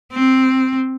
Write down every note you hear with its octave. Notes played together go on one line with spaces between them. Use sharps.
C4